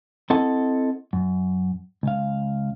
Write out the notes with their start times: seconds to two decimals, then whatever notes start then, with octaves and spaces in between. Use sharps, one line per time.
0.30 C4 E4 A4 D#5 F#5 A5
1.13 F#2
2.03 C#2 F5